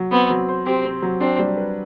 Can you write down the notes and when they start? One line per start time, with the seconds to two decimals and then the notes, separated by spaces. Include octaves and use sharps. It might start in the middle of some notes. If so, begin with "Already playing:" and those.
Already playing: F#3
0.11 B3 C4
0.30 F#3
0.49 C5
0.66 C4 G4
0.85 C4
1.02 F#3
1.21 C4 D4
1.39 G3
1.57 B4